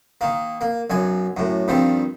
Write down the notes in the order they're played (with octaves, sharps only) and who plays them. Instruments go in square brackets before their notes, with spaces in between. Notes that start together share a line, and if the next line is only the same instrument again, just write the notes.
[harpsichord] D#3 A#3
A#3
B1 F#2 G#5
F#2 A2
G2 D#3 F3 C4